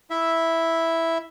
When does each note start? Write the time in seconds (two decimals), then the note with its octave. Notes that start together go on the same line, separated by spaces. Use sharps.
0.10 E4 E5